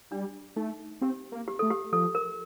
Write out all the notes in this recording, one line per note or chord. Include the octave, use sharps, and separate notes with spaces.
G3 D4
A3 D#4
C4 G4
A#3
G4
A3 A4
G4
F3 A4
A#4